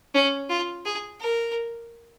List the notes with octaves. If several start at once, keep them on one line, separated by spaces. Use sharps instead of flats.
C#4
F4
G#4
A#4